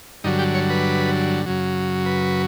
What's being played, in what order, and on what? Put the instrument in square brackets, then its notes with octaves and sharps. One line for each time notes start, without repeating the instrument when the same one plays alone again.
[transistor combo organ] G2 D3 F#3 D#4
G4
C#5
B4
F#2 C#3 F#3
B4